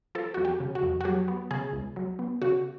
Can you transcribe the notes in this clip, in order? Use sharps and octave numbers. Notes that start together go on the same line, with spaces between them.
F3 A4
F2 F#4
G4
C#3
F#4
F2
F#4
F#3 G4
B3
C#3 G#4
C#2
F#3
B3
C#3 F#4